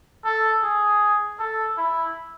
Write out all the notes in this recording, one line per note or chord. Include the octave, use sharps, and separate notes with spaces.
A4
G#4
A4
E4